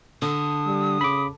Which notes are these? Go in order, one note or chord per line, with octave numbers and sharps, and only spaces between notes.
D3 D#6
G3
C#3 B5 D6